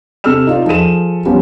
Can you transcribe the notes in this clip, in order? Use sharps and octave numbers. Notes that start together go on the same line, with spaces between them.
C3 A4 E6 F6 E7
D#4 F4 D5
F3 G#4 A4 D#7 E7
F3 G3 B3 C#4